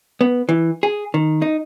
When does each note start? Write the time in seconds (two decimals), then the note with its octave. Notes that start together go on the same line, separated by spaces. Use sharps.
0.21 B3
0.49 E3
0.83 G#4
1.14 D#3
1.42 D#4